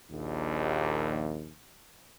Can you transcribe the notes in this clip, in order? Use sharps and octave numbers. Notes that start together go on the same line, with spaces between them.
A#1 D#2